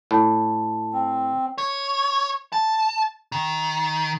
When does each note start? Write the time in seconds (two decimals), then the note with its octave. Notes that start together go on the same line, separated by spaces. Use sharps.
0.11 A2 A5
0.93 C4
1.58 C#5
2.53 A5
3.32 D#3